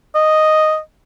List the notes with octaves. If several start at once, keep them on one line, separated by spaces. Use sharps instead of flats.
D#5